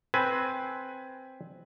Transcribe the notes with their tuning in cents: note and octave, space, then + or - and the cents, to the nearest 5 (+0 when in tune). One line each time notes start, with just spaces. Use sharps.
C4 +0 B4 +0 G#5 +15